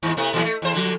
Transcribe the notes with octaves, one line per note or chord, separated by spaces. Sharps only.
D#2 G#2
C3 A3 B3
A#2 E3 F#3
A3
E2 C5
D3 F3